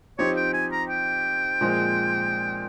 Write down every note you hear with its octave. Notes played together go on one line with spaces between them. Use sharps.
F3 C4 D#4 G4 C#5
G5
G#5
A#5
G5
A#2 F3 G#3 C4